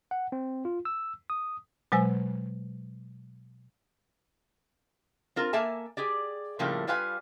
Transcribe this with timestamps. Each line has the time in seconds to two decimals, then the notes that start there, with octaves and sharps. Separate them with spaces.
0.11 F#5
0.32 C4
0.65 F4
0.85 E6
1.30 D#6
1.92 B2 F#3 G#3 C5 G#5 E6
5.36 C4 F4 A#4
5.53 A#3 A4 E5 G#5 A5
5.97 G4 G#4 D5
6.59 A2 C#3 F3 G3 A3 A#3
6.87 G3 F4 B4 F5 G#5